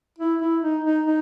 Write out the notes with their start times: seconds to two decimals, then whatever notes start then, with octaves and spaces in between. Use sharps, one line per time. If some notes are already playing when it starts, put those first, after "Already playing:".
0.19 E4
0.41 E4
0.62 D#4
0.84 D#4
1.06 D#4